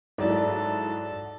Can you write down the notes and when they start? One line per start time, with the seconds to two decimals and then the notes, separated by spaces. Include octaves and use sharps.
0.18 G#2 F#3 E4 A4 D5 A5